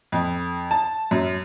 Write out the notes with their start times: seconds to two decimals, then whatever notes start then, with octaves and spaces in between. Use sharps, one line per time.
0.12 F2
0.71 A5
1.11 F#2